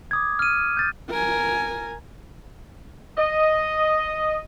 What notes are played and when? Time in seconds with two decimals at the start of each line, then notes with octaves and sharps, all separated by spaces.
0.11 D6 D#6 G#6
0.39 F6 D#7
0.77 G6 A6
1.10 A#4 G#5
3.16 D#5